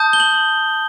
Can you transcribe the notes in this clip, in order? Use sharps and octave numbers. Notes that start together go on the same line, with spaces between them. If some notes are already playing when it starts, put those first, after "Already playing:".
Already playing: A5 D#6 G6
G7
F#7